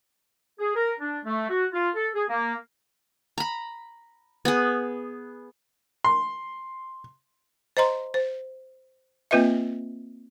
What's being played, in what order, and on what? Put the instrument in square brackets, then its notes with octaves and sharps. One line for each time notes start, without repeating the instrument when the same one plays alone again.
[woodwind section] G#4
A#4
D4
A3
F#4
F4
A4
G#4
A#3
[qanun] A#5 B5
B3 G#4
[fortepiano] C6
[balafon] C5 D#5 A#5 C6
C5
A#3 C4 F4 B4 D#5 E5